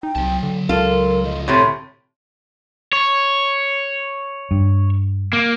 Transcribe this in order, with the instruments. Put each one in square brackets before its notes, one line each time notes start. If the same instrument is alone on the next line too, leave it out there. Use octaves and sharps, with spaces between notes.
[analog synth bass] D#4 [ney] G5
[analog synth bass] C2 [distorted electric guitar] F#3 A5
[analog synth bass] D3
[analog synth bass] C#2 [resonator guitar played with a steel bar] F4 A4 [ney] A#4
[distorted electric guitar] D2 F3 [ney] D#5
[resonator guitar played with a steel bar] A2 C3 A3 [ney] C#5
[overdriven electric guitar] C#5
[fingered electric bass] G2
[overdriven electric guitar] A#3